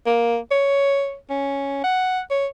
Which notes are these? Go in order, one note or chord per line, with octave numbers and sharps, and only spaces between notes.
A#3
C#5
C#4
F#5
C#5